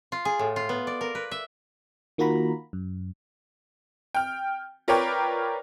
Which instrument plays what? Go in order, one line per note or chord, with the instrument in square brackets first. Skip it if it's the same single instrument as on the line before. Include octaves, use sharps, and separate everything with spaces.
[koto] F4
G#4
A2
F4
B3
D5
A#4
B4
E5
[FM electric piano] D#3 A#3 F4 F#4 A#5 B5
F#2
[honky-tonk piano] G5 F6
F4 A#4 B4 C#5 D5 G5